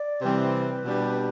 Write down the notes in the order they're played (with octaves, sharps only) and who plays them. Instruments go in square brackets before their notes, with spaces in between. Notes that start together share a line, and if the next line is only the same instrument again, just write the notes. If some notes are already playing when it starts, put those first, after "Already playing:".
Already playing: [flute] D5
[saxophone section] C3 E3 G3 C4 [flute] B4
[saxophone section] B2 G3 D4 G4